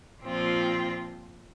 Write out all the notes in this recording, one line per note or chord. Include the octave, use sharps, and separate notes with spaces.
A#2 F3 C4 F4